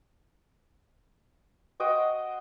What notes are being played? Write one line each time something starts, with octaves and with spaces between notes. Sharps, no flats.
F#4 C5 D#5 G5